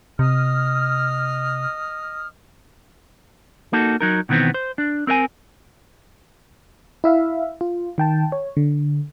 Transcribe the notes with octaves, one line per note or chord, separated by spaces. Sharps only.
C3 D#5 D#6 F6
A#3 D#4 F#4 A4
F#3 D#4 A#4
B2 D#3 E3 B3 C4
C5
D4
C4 A#4 D#5 G#5
E4 E5 F5
F4
D#3 G5 A5
C#5
D3